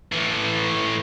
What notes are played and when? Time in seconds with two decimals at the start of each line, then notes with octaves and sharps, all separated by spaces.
0.12 A2 E3